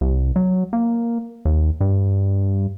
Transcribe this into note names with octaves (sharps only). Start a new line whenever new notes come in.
C2
F#3
A#3
D#2
G2